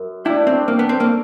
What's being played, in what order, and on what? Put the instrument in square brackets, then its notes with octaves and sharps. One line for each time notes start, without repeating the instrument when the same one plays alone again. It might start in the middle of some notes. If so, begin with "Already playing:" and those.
Already playing: [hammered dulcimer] F#2
[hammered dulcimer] A3 D4 G4 [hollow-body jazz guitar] E4
[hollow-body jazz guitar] C4
A#3
B3
C4
A#3